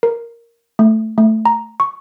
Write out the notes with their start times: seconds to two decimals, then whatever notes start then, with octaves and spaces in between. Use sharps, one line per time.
0.03 A#4
0.79 A3
1.18 A3
1.46 A#5
1.80 C#6